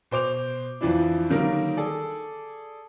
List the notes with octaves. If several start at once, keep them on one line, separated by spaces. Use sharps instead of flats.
B2 C5 D6 F7
F2 E3 F3 D4 E4
D3 D#3 F#3 G3 A#3 A#4
G#4 A4 D5